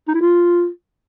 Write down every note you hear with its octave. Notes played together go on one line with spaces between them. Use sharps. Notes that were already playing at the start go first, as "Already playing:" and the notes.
D#4
E4
F4